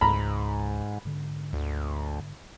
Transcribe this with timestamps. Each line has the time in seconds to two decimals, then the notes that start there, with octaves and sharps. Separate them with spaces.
0.01 C#2 G#2 A#5 B5
1.05 G#2 D3
1.53 D2